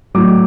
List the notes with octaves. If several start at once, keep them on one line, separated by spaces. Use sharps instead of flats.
A2 F#3 D6